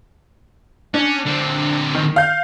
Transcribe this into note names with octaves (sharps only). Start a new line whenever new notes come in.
C#4 D4
D3 C4
D#3
F5 G6